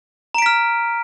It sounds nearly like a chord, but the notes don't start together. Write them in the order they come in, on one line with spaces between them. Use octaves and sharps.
A#5 D7 B6 F6